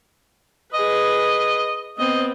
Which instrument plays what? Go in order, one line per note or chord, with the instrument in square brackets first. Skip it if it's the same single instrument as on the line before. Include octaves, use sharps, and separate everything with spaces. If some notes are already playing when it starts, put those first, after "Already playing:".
[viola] G#4 B4 [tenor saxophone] D#5
[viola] B3 C4 [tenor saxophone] D#5